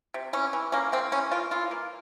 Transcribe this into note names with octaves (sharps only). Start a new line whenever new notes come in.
C3
E3 C#4
E3
A#3 C#4
C3 C4
E3 C#4
A#3 F4
E3 F4
A#3